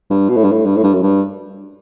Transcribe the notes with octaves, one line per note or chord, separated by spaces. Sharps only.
G2
B2
A2
G2
A2
G2
A2
G2
F#2
G2